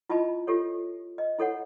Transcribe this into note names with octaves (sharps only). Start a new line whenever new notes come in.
E4 F4 D#5 A5 B5
F4 G4 A4 C#5
D#5
E4 A4 C#5 F#5